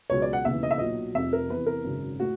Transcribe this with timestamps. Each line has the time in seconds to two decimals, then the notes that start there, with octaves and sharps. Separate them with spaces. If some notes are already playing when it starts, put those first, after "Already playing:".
0.10 C#2 B2 F#3 C#5
0.22 D5
0.33 F#5
0.45 E1 D#2 C#3 E3 E5
0.63 D#5
0.71 E5
0.78 B1 A#2 F#3 D#5
1.14 F1 F2 C3 F3 E5
1.33 A#4
1.49 E2 C3 E3 B4
1.66 A#4
1.84 G#1 F#2 C#3
2.20 A2 F#4